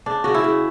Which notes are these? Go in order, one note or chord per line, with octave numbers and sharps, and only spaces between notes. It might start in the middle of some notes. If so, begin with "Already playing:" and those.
C#3 D4
C#3 F#4
E4
C#3